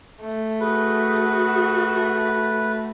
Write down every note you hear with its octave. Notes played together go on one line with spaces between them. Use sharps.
A3
F#4 G#4 B4